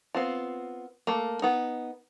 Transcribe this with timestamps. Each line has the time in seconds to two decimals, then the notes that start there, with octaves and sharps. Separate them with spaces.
0.15 B3 C4 F4
1.07 A3 A#3
1.42 B3 D#4